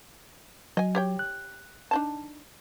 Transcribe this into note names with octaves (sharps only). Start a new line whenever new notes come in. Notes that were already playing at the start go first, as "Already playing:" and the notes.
F#3 D#5 G#5
G4 C#5 G5
F#6
D4 D#4 A5